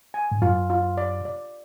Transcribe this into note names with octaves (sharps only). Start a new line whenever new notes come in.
G#5
G#2
F#2 F4
F4
D5
D5